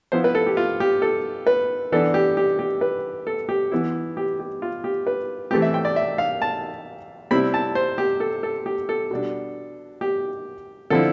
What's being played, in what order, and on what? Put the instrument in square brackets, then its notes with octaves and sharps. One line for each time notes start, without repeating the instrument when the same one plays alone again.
[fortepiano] F3 B3 E4 C5
B4
A4
G4
F4
G4
A4
B4
E3 B3 D4 A4
G4
G4
G4
B4
A4
G4
E3 B3 E4
G4
G4
F4
G4
B4
E3 A3 C4 G4
E5
G5
D5
E5
F5
A5
C3 G3 C4 E4 B5
A5
C5
G4
A4
A4
G4
A4
B2 G3 D4
G4
D3 F3 C4 E4 A4